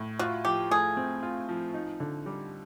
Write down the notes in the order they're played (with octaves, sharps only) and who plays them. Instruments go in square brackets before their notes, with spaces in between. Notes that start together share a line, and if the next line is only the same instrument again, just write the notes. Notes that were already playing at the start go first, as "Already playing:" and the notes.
Already playing: [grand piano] A2
[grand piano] F4 [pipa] F#4
[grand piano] F3 [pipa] G4
[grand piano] A3 [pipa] G#4
[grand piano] C4
F4
F3
D#4
D3
G3